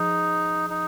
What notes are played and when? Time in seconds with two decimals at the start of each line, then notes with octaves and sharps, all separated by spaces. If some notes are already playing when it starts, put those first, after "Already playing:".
Already playing: F3 D#4 G#4
0.70 D#4